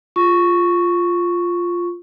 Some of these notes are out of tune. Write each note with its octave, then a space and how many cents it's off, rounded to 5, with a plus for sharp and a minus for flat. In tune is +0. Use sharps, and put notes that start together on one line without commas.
F4 +0 C#6 +0